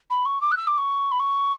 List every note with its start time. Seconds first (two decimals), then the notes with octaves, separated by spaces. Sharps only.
0.10 B5
0.25 C#6
0.41 D6
0.51 F#6
0.57 E6
0.67 D6
0.78 C#6
1.11 B5
1.19 C#6